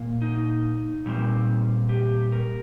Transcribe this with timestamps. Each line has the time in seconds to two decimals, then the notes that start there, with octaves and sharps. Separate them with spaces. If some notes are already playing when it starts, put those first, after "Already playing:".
Already playing: A#2 A#3
0.22 D#4
1.06 A#2 G3 C4
1.89 G4
2.32 A#4